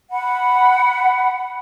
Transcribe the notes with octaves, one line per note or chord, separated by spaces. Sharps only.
F#5 B5